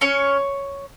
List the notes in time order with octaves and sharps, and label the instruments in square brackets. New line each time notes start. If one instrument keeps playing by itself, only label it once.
[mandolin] C#4 C#5